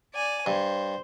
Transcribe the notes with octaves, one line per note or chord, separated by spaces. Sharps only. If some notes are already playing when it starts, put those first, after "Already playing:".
D5 G#5
G2 C5